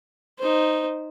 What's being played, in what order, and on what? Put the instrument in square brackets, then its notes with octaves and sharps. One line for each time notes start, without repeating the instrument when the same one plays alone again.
[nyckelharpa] D#4 C5